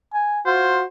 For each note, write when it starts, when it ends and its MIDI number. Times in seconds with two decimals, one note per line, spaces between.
0.13 0.41 80
0.46 0.82 65
0.46 0.85 66
0.46 0.83 72